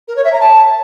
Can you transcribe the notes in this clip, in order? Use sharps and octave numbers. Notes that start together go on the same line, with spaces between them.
A#4
C#5
E5
A#5
A5